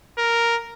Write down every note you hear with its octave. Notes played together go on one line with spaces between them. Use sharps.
A#4